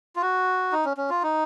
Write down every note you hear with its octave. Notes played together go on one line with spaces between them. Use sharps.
F4
F#4
D#4
C#4
C#4
F4
D#4